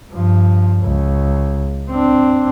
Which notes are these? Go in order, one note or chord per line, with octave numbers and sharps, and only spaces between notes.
G2 F3
C#2
C4 D4